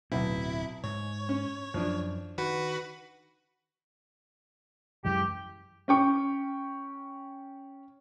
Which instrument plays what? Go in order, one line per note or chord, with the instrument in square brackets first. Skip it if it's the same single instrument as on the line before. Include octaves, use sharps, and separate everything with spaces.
[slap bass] D1 C4 [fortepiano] B1 [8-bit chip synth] E4
[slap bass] G#2 [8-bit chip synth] C#5
[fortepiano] C#4
[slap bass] F#2 E3 [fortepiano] F3 D4
[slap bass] D#3 [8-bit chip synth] F#4 B4 B5
[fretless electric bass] F#2 E3 G#3 [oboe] G4
[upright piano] C#4 G5 C#6